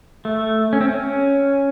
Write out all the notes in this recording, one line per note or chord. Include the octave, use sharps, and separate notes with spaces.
A3
C#4
C4
C#4